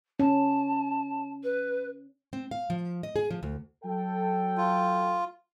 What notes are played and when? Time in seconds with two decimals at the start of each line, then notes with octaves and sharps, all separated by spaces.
0.19 C#4 A5
1.43 B4
2.33 C4
2.51 F5
2.70 F3
3.03 D#5
3.16 G#4
3.31 F3
3.43 D2
3.84 F#3 A4 G5
4.57 F4